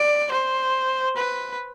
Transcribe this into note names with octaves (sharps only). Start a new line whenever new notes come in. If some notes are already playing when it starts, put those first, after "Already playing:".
Already playing: D5
C5
B4